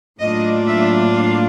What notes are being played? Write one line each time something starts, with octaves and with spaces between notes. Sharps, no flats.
A2 F#3 A#3 D4 F4 D#5
E5
F5